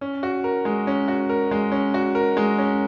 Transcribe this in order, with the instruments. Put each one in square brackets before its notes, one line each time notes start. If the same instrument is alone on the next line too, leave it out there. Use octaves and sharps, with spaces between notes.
[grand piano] C#4
F#4
A#4
G#3
C#4
F#4
A#4
G#3
C#4
F#4
A#4
G#3
C#4